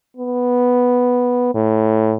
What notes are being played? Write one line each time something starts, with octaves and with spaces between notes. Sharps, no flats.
B3
A2